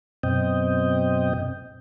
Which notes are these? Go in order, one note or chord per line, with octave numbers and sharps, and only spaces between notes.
F#2 B2 C4 D#5 G5